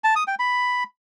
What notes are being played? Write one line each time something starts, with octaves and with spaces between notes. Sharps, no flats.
A5
D#6
G5
B5